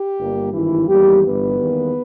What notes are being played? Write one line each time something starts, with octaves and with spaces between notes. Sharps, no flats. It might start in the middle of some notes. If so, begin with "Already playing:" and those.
Already playing: G4
G1 G2 G3 A#3
G#1 G2 D#3 E3 E4
E2 D#3 G3 A#3 G4
G1 G2 E3 B3 B4
E2 D#3 G3 A#3